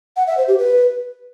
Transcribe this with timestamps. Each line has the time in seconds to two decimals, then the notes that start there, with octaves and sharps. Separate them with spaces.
0.17 F#5
0.27 E5
0.37 C5
0.48 G4
0.58 B4